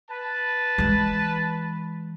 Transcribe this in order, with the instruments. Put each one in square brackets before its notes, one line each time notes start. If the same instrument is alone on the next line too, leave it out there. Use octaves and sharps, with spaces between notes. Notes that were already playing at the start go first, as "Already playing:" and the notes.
[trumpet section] B4 A5
[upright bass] E3 G#3